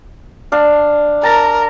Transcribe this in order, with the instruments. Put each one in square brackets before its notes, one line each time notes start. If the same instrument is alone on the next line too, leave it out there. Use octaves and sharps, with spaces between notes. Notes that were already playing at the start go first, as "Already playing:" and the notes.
[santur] D4 F5
[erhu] A#4 [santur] A5 A#5